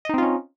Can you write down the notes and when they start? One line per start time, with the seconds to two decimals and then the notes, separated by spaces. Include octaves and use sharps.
0.05 D#5
0.09 D#4
0.14 C4
0.18 F4
0.22 C#4